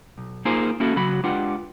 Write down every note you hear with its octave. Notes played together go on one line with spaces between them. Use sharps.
B1
A#3 D#4 F4 G#4 A#4 C5
A#3 C#4 E4 F#4 A4
C#3 F#3 F#4 B5
G#3 D4 F4 G4 B4 F#5